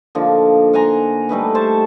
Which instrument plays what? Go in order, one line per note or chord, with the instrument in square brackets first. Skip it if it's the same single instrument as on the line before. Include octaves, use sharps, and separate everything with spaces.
[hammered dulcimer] D3 F3 A#3 D#4
F#5 G#5 A#5 C6
G3 A3 D#4 B4
C5 A5 C#6